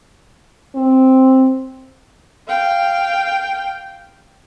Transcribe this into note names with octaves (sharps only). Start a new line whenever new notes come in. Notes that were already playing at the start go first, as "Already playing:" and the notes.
C4
F5 G5